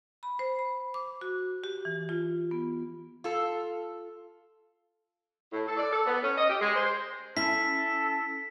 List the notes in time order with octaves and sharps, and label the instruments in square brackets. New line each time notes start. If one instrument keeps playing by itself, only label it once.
[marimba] B5
C5
B5
D6
F#4
G4
E3
F4
B3
[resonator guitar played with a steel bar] F4 A4
[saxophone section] A2
A4
D5
A4
B3
C#4
D#5
G4
G#3
C5
[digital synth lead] C#4 [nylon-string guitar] E4 [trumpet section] A4 [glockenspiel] B6